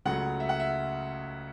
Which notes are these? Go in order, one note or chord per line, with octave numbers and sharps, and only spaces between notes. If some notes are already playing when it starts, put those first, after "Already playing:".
C#2 C#3 F#3 A3 F#5
E5
F#5
E5